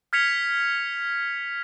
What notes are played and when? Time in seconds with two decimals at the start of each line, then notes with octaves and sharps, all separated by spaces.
0.13 F6 G#6 B6 C#7 F7